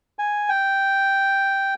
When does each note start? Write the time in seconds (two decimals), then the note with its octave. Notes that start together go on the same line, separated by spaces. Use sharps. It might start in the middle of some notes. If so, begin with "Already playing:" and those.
0.19 G#5
0.49 G5